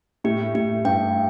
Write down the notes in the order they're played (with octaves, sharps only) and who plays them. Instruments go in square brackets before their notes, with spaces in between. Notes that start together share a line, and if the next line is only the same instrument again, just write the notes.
[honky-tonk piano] A2 [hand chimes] G4
[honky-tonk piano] A2 [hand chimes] G4
[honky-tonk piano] G2 [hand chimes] G5